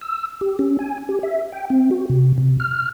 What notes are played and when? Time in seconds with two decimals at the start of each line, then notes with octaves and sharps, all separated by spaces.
0.01 E6
0.41 G4
0.59 C#4
0.79 G#5
1.09 G4
1.23 E5
1.52 G5
1.70 C4
1.91 F#4
2.10 C3
2.38 C3
2.60 F6